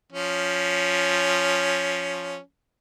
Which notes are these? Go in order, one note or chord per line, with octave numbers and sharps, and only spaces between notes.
F3 C#4